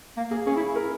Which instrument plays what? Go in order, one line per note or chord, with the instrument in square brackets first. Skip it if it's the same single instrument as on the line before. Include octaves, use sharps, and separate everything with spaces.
[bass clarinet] A#3
[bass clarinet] A#3 [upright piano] G#4
[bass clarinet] C#4 [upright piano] G#4
[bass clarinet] E4
E4
[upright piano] A#4